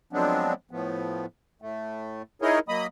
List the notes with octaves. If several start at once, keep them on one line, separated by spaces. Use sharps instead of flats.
F3 F#3 G#3 B3 C4 D4
A2 F3 B3
A2 A3
D#4 E4 G#4 A#4 C#5 D#5
F#3 A#3 D#5 B5 D#6